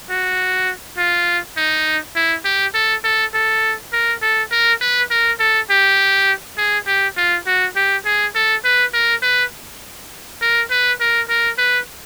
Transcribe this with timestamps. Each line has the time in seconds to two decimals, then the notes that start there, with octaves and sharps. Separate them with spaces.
0.10 F#4
0.98 F4
1.57 D#4
2.16 E4
2.45 G4
2.74 A4
3.04 A4
3.34 A4
3.93 A#4
4.22 A4
4.52 A#4
4.81 B4
5.11 A#4
5.40 A4
5.70 G4
6.58 G#4
6.87 G4
7.17 F4
7.46 F#4
7.76 G4
8.05 G#4
8.35 A4
8.64 B4
8.94 A#4
9.23 B4
10.42 A#4
10.71 B4
11.00 A#4
11.29 A#4
11.58 B4